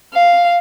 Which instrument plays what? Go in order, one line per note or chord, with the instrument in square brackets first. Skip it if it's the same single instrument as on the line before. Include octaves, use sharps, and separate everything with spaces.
[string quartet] F5